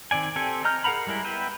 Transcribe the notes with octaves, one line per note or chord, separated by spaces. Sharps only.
D#3 C4 D5 G#5
C4 G4 A4 G#5
D#5 A#5 F6 G6
G#4 A#4 F#5 A#5 B5
G3 G#3 E4 A#4
B3 B4 E5 G5